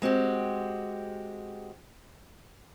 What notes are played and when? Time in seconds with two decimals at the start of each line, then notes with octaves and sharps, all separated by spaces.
0.02 G#3 C4 F#4 G4